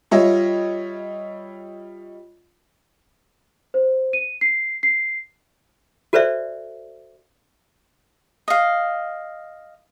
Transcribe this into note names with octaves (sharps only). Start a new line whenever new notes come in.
G3 F4 C#5 D#5 E5
C5
D#7
C7
C7
F#4 A4 B4 C5 D5 E5
D#5 F5